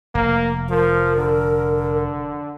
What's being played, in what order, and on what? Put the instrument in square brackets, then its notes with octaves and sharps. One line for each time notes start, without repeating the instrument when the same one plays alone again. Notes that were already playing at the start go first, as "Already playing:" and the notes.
[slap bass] F1 [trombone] A#3
[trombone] F3 [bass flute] A#4
[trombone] D3